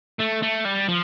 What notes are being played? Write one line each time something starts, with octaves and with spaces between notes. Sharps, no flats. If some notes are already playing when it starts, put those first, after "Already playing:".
A3
A3
G3
F3